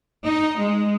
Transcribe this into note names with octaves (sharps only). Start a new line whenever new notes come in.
D#4
G#3